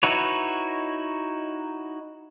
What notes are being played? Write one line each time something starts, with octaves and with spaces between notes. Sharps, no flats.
D#4 E4 F#4 B4 C#5